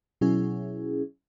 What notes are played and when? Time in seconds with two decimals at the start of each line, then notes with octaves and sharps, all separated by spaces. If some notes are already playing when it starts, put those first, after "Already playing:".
0.21 B2 F#3 C#4 E4 G#4